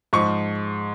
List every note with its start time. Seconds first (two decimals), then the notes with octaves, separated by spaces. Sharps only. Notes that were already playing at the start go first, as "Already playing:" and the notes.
0.13 G#2 F3 C#6